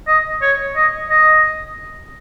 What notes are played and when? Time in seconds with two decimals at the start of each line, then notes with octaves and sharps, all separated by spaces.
0.07 D#5
0.42 C#5
0.76 D#5
1.10 D#5